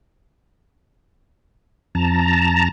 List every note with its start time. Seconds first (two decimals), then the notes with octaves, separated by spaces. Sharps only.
1.95 F2 A5 A#5